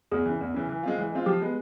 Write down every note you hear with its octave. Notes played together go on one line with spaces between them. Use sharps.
E2 G#4
C#3 E3
E2
C#3 E3
E3
G#3 C4 F4
E3
G#3 C4 F4
F3 G4
G#3 B3